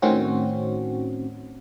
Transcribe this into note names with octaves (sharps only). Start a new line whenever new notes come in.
A2 D#3 C4 C#4 F#4